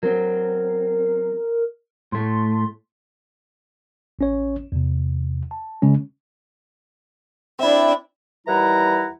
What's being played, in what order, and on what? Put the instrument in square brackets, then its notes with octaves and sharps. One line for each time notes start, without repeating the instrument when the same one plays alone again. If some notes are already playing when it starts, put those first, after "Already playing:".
[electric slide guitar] F#3 C4 [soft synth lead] A#4
[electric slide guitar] A2 A3 [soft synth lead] C6
[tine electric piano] A1 C#4 C#5
E2 C3
A5
C#3 G#3 C#4
[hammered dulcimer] C4 E4 [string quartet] D4 D5 E5
[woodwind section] D#2 E3 G3 E4 F#5 A#5